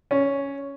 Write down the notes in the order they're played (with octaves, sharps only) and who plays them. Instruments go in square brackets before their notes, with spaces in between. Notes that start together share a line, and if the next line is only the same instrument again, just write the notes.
[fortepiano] C#4